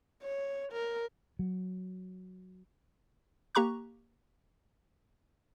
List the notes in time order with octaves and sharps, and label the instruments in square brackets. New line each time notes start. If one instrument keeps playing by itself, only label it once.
[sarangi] C#5
A#4
[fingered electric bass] F#3
[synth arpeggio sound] A#3 G4 A#5 C#6 F#6